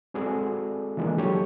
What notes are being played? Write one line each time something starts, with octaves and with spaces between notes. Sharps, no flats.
G#3 C4 F#4 G#4 A4 D5
E3 F3 G#3 A#3 D4
F#3 G4 A4 C#5